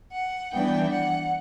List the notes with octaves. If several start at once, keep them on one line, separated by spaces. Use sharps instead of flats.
F#5
E3 G3 B3 D4 G5
F#5